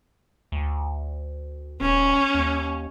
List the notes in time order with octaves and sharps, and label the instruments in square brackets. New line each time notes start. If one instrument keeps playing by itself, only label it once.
[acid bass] D2
[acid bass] D#1 [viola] C#4
[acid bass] D#2